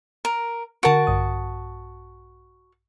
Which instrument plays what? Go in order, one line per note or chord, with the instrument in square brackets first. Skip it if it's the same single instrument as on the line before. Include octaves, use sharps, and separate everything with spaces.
[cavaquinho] A#4
[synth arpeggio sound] D3 A#4 D7 [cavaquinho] F#4 A5
[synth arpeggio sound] A#1 G2 D#6